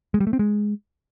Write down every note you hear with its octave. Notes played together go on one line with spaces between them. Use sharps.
G#3
G3
A3
C4
G#3